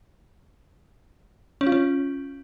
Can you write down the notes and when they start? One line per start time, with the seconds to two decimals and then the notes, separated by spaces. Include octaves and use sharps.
1.61 C#4
1.67 F4
1.72 C#4